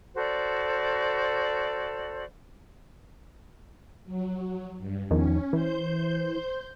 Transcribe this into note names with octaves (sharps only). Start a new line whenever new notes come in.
F#4 A4 C5 D5
F#3
G2
E2 D#3 F3 C#4
E3 C5 G6